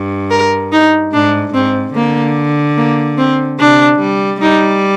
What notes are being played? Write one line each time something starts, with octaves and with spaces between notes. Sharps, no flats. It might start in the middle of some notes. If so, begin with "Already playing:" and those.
Already playing: G2
A#4
D#4
G#2 D4
G#2 C4
D3 A#3
A#3
C4
C3 D4
G3
G3 D#4